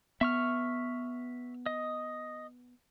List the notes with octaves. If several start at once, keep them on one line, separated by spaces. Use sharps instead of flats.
B3 E5 C#6 F6
D#5